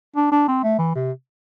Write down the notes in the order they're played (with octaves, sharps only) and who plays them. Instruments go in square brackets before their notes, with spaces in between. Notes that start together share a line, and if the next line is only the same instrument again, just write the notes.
[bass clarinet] D4
D4
C4
A3
E3
C3